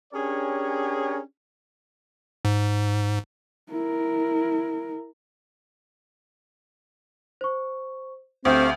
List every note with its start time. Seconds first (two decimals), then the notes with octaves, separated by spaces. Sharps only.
0.14 C#4 D4 G4 G#4 A#4 C#5
2.45 G#2
3.71 E4 A#4
7.41 C5 C#6
8.45 D2 A3 C4 G4 F5 D#6 G6